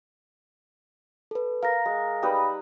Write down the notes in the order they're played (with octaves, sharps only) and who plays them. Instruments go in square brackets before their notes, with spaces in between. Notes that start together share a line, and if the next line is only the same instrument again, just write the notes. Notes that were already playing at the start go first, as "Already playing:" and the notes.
[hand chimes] A4 B4
[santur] A#4 [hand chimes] F5 A#6
[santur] G#3
G3 D#4 B4